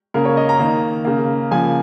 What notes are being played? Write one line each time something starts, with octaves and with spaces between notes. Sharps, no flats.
C#3 A#3 A#4
C#5
D#5
A#5
D#3 A#3
C#3 A#3
C#3 F3 A#3 G#5